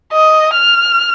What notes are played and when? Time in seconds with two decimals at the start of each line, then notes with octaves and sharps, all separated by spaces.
0.12 D#5
0.53 F6